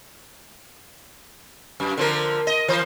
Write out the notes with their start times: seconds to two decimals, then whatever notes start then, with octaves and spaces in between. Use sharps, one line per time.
1.80 F#2
1.97 D3 F3 A#4
2.47 D#5
2.68 E3 C5